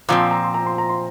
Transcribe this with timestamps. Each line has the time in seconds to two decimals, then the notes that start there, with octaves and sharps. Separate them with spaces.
0.09 A#2 F3 C4 A#5
0.20 C6
0.31 A#5
0.44 C6
0.54 A#5
0.67 C6
0.78 A#5
0.89 C6